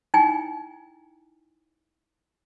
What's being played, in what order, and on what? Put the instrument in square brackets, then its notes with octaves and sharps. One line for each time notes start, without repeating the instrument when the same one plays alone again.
[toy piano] D#4 E4 G5 G#5